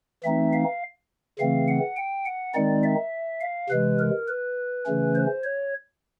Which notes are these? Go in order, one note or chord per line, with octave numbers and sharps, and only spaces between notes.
E3 A3 C4 D#4 E5
F5
C#3 E3 A3 C4 F5
F#5
G5
F#5
D#3 G#3 C4 D#4 D5
E5
F5
C3 E3 G#3 B4
A#4
B4
C#3 E3 A3 C#4
C5
C#5